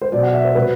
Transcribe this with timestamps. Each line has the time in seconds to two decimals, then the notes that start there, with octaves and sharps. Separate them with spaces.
0.01 C5
0.12 B2 F#3 D5
0.23 F#5
0.34 E5
0.44 C5
0.55 C3 F#3 B4